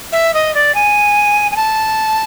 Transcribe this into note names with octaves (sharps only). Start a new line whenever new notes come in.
E5
D#5
D5
G#5
G#5
A5